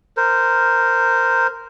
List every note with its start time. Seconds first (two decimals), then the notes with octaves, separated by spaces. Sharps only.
0.17 A#4 C5